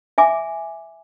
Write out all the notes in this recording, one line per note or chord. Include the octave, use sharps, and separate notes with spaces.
E5 G#5 D6